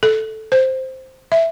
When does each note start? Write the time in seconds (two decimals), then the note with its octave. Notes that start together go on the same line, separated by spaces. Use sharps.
0.03 A4
0.52 C5
1.32 E5